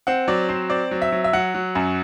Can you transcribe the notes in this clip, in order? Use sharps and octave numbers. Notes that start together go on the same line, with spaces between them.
C4 F#5
F#3 D5
C4 C5
C4 D5
F#3
E5
F#3
E5
F#3 F#5
F#3
F#2